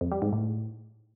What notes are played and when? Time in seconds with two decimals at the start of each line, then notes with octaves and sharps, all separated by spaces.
0.01 F2
0.11 G3
0.22 G#2
0.32 A2